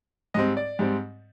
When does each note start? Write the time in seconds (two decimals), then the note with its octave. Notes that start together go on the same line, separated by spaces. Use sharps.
0.34 G#2 G3 C4 D#5
0.57 D5
0.79 G#2 G3 C4